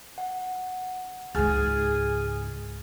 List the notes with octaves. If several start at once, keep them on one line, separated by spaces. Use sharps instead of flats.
F#5
C#2 G#2 G#4 G#5 F6 A6